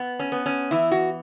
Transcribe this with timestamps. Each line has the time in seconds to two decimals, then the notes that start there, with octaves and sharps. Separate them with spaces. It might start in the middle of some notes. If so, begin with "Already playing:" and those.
Already playing: B3
0.20 C#4
0.32 B3
0.46 C#4
0.71 E3 E4
0.92 F#4